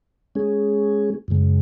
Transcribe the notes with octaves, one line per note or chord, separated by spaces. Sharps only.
G#3 C#4 G#4
F#2 C#3 G#3